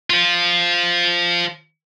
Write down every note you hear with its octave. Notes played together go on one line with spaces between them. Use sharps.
F3 F4